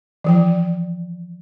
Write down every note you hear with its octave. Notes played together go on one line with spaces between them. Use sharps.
E3 F3 G5